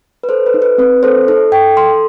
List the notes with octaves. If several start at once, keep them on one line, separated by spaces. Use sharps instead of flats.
B4
A4 C5
B4
D#4
B4
C4 B4
A4 C5
D#4 A4
A4 G5
A4 C6